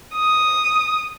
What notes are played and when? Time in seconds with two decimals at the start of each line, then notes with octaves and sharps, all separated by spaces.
0.14 D#6